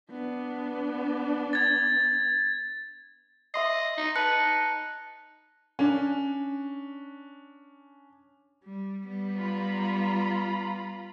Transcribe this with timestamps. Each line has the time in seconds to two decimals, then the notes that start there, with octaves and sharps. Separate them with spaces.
0.11 B3 D4
1.53 G#6 A6
3.54 D#5 E5 C6 C7
3.97 D#4
4.16 B4 A5 F#6 C#7
4.39 D#4
5.79 C#4 D4
8.64 G3
9.08 G3 B3
9.38 F4 A#5 B5